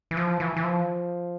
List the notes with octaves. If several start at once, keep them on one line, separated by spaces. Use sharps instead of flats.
E3
F3
E3
E3
F3